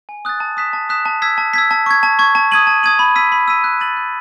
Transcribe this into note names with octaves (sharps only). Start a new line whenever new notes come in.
G#5
D#6 F#6 A6
A5
D#6 F#6 B6 E7
A5
D#6 F#6 B6 E7
A5
E6 G#6 B6
A5
E6 G#6 B6
A5
C#6 G#6
A5
C#6 G#6
A5
D#6 G#6 D#7 F#7
A5
D#6 G#6 D#7 F#7
B5
E6 B6 D#7
B5
E6 B6 D#7
F#6
A6 D#7 F#7
F#6